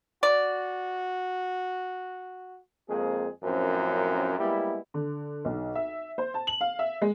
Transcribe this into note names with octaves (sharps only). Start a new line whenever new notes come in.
F#4 D5
F2 G#3 A#3 C4 G#4
F#2 A2 F3 C4 C#4 A#4
G3 G#3 A#3 B3 E4
D3
B1
E5
C5
A5
F#7
F5
E5
G#3